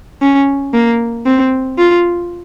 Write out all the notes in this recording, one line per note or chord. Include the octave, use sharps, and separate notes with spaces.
C#4
A#3
C4
F4